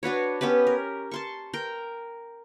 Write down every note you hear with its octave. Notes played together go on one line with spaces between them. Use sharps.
D4 F#4 B4 C#5
B3 C#4 G4 B4
A#4
A5 C6 C#6
A#4 G5